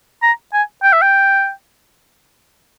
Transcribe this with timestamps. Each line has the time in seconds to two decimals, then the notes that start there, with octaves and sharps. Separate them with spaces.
0.22 A#5
0.53 G#5
0.83 G5
0.93 E5
1.02 G5